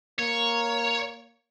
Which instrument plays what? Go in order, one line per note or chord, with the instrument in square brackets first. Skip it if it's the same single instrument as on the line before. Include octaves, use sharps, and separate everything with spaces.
[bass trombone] A#3 [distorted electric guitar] C#5